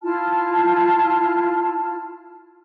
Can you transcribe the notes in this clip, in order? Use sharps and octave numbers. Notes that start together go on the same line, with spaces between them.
E4 F4 A5 F6